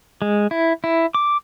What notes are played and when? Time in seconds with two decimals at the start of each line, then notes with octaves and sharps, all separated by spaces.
0.22 G#3
0.51 E4
0.84 E4
1.15 D6